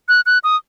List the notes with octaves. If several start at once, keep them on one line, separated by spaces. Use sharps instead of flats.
F#6
F#6
D#6